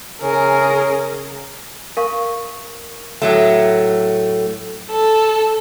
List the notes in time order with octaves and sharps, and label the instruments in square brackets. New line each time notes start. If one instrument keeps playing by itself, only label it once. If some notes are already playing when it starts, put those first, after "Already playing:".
[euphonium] C#3 [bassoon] C#4 [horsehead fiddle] G#4 [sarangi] A#4
[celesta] A#4 F5 C#6
[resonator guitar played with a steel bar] A2 F#3 A3
[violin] A4